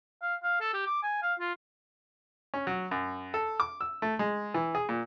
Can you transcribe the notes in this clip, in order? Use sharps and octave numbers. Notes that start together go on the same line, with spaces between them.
F5
F5
A4
G4
D6
G#5
F5
F4
C#4
F#3
F#2
A4
D6
E6
A3
G#3
E3
G#4
A#2